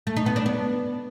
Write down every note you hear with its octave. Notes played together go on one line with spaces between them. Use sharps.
A3
D#4
B3
D4
B3